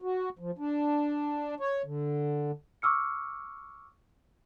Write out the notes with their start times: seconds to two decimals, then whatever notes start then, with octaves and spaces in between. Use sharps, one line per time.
0.02 F#4
0.39 F3
0.58 D4
1.60 C#5
1.85 D3
2.82 C#6 D6 E6 F6 C#7